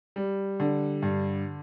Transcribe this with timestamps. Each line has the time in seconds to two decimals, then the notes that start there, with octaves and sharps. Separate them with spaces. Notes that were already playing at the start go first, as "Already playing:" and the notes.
0.16 G3
0.60 D3
1.02 G2